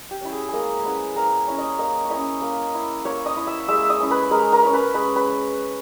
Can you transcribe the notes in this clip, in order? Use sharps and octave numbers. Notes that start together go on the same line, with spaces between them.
G4
C#4 E4
G#4
G#3 A#3 G#4 A#4
B3 C#4 E4 B4
A#3 A#4 A#5
C#4 E4
D#5 D#6
A#3 D#5 D#6
C#6
C#4 E4 D#5 D#6
A#3
E4
A#3 C#5 C#6
D#5 D#6
E4
E5 E6
G#3 E5 E6
D#5 D#6
C#4 E4
B4 B5
G#3 A#4 A#5
A#4 A#5
C#4 E4
B4 B5
G#3 B4 B5
B4 B5